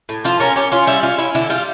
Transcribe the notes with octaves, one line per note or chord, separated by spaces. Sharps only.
A2
F3 F4
C#4 A#4
C#4 G4
C#4 F4
G3 E4
C#4 F4
C#4 E4
D3 E4
G3 F4